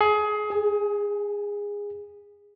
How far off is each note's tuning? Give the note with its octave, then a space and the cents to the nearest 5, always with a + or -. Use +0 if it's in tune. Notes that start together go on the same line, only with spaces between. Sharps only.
G#4 +25
G#4 -20